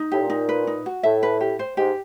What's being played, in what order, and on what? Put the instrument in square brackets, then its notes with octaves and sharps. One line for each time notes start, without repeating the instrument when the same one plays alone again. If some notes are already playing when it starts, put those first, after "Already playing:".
Already playing: [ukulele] D#4
[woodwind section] A2 [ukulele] G4
[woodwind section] A#2
[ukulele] D#4
B4
D#4
F#4
[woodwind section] A2 [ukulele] E5
[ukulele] B4
G4
C5
[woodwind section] G#2 [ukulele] G4